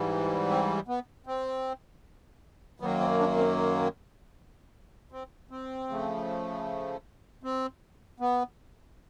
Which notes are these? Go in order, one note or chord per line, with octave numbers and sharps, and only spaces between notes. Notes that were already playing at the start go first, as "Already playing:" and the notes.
Already playing: G#2 E3 G3
C4
B3
C4
F#2 D#3 F#3 A#3 B3
C4
D4
C4
C4
C4
C#3 F3 A3
C4
B3